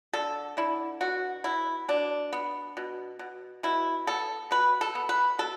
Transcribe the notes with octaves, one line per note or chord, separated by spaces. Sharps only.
D3 A4
D3 E4
B2 F#4
B2 E4
B2 D4
B3
B2
B2
B2 E4
B3 A4
B2 B4
A4
B3
B4
B2 A4